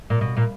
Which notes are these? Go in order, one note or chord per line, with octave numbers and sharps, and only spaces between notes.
A#2
B2
A#2